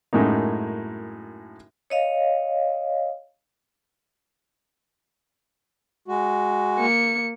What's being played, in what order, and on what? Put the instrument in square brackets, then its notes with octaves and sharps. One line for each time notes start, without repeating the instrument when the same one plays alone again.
[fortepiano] F#2 A2 G#3 A#3 D#4
[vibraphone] C#5 D#5 F5
[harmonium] G#3 F#4
[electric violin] A#3 C#7